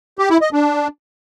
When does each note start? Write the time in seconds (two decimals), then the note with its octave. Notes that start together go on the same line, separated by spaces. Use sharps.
0.19 G4
0.30 E4
0.41 D#5
0.53 D4